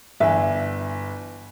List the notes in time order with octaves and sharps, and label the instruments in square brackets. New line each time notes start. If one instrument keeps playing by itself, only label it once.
[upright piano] G1 E3 [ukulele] E5